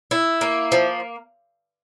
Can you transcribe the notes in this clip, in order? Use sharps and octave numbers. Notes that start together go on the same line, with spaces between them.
E4
A#3
F3